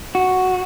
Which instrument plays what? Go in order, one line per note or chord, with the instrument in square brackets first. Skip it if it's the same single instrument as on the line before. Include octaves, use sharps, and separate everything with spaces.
[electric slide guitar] F#4